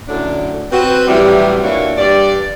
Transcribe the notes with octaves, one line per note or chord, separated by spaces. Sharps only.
F#2 A2 D3 F#3 D4
C4 F#4 B4
A2 C3 E3 F#3 G3
A#2 E3 A#3 D4 F#4 C#5
G2 D5